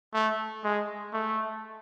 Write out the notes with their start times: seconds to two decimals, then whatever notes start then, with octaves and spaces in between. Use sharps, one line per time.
0.14 A3
0.64 G#3
1.13 A3